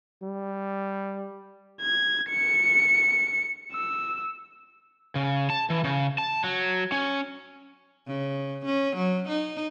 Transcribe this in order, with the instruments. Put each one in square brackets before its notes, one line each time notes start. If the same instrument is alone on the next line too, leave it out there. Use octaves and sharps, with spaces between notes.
[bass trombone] G3
[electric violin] G#6
C#7
E6
[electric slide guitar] C#3
A5
E3
C#3
A5
F#3
C#4
[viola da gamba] C#3
C#4
F#3
D#4